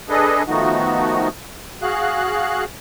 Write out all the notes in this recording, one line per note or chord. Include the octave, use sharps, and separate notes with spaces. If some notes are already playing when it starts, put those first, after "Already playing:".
D4 G#4 A4 B4 D#5
D#3 F3 A3 B3 D#4 F#4
F#4 G#4 F5 F#6